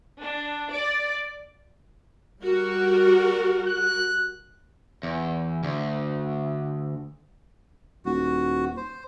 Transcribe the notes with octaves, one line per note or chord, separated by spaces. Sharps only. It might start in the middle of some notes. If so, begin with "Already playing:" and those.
D4
D5
G3 F#4 A#4
F#6
E2
D2
D#1 F#4
C5